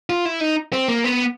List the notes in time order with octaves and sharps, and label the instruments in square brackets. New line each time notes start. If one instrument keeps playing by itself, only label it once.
[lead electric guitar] F4
E4
D#4
C4
A#3
B3